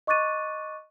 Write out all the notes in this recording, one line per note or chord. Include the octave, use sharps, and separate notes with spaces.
D#5 C#6 D6 F#6 A6 D#7